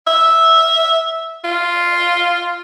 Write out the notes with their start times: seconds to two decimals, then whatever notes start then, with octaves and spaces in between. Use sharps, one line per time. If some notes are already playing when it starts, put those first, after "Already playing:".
0.07 E5
1.44 F4